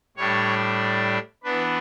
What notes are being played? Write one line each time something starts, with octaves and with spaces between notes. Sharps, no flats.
A2 G3 D4 C#5
E3 B3 D4 B4